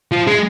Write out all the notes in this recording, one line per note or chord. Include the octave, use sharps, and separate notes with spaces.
F3
G#3